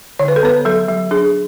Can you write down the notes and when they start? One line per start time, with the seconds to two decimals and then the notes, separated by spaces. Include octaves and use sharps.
0.19 D3 C#5
0.28 B4
0.36 A4
0.43 B3 B4
0.65 F#3 A4
0.89 F#3
1.11 D4 G#4